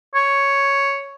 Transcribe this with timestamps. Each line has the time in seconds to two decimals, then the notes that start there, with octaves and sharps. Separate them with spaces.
0.15 C#5